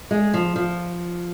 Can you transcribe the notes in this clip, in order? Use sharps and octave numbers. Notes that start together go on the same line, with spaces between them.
G#3
F3
F3